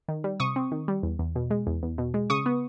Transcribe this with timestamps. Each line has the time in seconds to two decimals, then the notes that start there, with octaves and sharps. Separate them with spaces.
0.08 D#3
0.24 G3
0.40 C3 C#6 D#6
0.56 C4
0.72 D#3
0.88 G3
1.03 E2
1.19 E2
1.36 B2
1.51 G#3
1.67 E2
1.83 E2
1.98 B2
2.14 G#3
2.30 C#3 C#6 D#6
2.46 B3